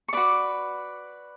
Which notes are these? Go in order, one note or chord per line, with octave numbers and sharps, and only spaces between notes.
C#6
F#4 B4 D5 D6